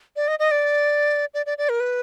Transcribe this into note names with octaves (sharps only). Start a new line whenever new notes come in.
D5
D#5
D#5
D5
D5
D5
D5
A#4
B4